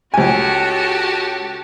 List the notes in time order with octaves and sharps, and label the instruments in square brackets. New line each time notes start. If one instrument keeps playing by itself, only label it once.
[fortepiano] C#2 G#5 [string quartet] F#4 G4 A4